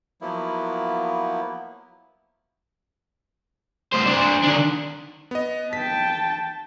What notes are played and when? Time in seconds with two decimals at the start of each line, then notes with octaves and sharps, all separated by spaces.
0.21 F3 F#3 A#3 B3 E4
3.93 A2 C5
4.07 D4 C5
4.44 D#3 D4
5.31 B3 D#5
5.73 G5 A5 B6